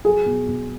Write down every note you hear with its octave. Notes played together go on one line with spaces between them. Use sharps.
F#3 G#4
B2
B2